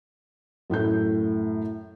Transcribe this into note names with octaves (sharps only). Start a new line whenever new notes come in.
F#2 A2 A3 G6